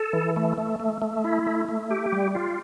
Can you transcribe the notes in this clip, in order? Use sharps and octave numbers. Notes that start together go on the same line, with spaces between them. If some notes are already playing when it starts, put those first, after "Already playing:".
Already playing: A4
E3
A3
A3
A3
A3
E4
A3
A3
G4
G3
F4